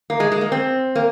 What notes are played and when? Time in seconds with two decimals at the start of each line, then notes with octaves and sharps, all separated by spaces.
0.10 A#3
0.20 G#3
0.32 G#3
0.41 A#3
0.52 C4
0.95 A#3